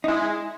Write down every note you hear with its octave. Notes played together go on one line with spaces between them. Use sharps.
D#4
G#3 E4